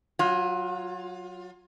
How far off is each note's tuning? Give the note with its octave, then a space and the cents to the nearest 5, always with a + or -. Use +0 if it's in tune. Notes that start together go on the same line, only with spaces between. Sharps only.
F#3 +0 F4 +25